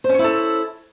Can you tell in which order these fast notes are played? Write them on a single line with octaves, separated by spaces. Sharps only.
C5 C#4 C#5 E4 A4